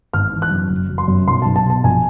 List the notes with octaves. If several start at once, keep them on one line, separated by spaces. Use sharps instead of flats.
G#1 F6
E3
F#6
F#2
F#1
F#3
C6
F#2
B1 C6
B1 A5
A5
B2
A5
A#1 G#5